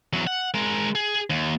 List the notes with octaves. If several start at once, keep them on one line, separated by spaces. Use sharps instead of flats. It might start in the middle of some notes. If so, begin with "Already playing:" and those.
E2 F#3
F#5
G#3 A#4
G#4
D#2